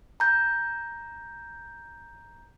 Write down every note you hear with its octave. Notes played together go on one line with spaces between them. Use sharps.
A#5 G6